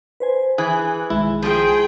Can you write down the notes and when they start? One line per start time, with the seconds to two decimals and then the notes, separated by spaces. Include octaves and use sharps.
0.20 B4 C5 G#5
0.58 E3 G#4 G#5 F#6
1.10 B1 D#3 G#3 E4
1.42 F3 G#4 G5